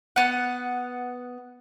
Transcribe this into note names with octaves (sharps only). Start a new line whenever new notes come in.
B3 F#5